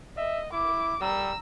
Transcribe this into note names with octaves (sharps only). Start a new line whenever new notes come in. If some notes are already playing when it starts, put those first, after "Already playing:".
D#5 E5
E4 D6
G3 A#5 E6